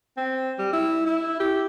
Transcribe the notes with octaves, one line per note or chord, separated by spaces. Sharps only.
C4
G3
E4
E4
G4